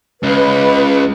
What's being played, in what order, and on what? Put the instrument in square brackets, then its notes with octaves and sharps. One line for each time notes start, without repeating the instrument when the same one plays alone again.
[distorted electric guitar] C#2 [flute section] B4